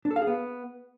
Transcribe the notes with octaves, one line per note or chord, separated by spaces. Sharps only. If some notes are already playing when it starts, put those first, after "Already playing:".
D4
A4
F5
G#4
B3